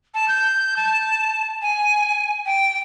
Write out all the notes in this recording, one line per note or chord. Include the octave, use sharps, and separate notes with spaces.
A5
G6
A5
G#5
G5